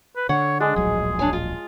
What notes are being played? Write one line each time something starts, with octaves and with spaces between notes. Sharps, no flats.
B4
D3 C#5 F#5
G#3 D4
D1 A#1 F#3 G#4
D4 C#5 G#5
F4